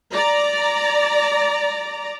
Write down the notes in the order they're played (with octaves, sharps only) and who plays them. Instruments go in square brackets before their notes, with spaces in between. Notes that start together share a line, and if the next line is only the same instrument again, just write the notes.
[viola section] D5 A#5